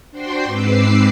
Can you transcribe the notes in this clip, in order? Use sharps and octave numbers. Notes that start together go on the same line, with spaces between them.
D4 F#4 C5 G5 C6
G#2 C4 B4 D6 E6 C7